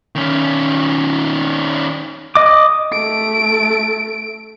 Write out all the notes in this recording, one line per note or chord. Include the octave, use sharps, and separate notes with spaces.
D#3 C#4
D#5 D6
A3 D7